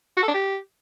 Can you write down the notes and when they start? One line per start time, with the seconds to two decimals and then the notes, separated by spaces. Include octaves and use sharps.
0.17 F#4
0.23 A4
0.28 D4
0.34 G4